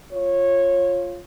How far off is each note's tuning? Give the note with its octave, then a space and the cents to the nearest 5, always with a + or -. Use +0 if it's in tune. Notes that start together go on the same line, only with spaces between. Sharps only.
F4 +0 C#5 -20